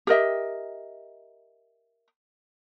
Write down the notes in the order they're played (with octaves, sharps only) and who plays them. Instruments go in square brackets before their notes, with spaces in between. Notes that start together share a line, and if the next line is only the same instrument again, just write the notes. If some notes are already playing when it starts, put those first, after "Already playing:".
[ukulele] G4 A#4 D#5 E5